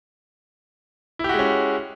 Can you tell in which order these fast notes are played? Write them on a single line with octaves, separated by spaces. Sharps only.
E4 G4 F#4 G#3 C#4